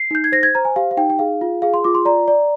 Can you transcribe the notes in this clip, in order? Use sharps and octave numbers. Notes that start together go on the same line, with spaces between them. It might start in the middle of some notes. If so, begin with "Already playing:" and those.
Already playing: C7
D#4 G6
G#6
C5 A#6
G#6
C5 A#5
G#5
G4 F5
F5
D#4 G5
G5
G#4 F5
F4
G#4 F5
C6
F4 D6
C6
D5 A#5
D5